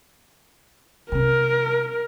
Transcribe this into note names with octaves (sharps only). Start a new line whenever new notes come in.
C3 C#4 A#4